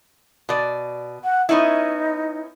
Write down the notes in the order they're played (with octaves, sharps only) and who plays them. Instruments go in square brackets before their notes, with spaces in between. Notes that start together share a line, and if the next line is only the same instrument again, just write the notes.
[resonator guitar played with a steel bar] B2 D5
[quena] F#5
[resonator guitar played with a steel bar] B3 C#4 E4 [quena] D#4